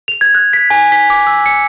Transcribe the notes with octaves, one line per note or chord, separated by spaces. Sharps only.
F7
G#6
F#6
B6
G#5
B6
D6
E6
C#7